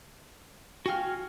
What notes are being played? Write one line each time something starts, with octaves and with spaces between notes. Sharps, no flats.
F4 F#4 G5 G#5 F6